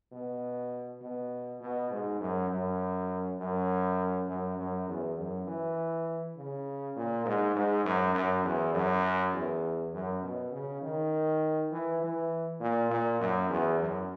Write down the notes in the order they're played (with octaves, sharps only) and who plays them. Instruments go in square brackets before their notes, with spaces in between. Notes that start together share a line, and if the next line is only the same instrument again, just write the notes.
[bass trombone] B2
B2
B2
G#2
F#2
F#2
F#2
F#2
F#2
E2
F#2
E3
C#3
A#2
G#2
G#2
F#2
F#2
E2
F#2
E2
F#2
B2
C#3
D#3
E3
E3
A#2
A#2
F#2
E2
F#2